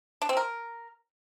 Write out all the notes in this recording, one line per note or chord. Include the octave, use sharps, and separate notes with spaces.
D4
C4
A#4